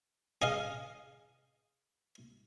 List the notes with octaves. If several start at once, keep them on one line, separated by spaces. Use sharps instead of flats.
G#4 D#5 F5